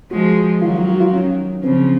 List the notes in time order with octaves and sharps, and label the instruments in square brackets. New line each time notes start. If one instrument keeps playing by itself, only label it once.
[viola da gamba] F3 G#3 [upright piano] F#4
[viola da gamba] D#3 F#3 [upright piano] F4
[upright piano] F4
F#4
F4
C#4
[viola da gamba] C#3 F3 [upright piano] C4